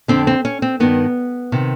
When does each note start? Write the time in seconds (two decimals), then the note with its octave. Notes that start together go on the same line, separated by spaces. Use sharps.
0.08 F2 D3 C4
0.27 C4
0.45 C#4
0.62 C4
0.80 G2 D#3 B3
1.52 C3 D#3